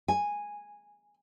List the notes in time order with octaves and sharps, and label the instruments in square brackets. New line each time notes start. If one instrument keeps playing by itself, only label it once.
[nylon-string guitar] G#5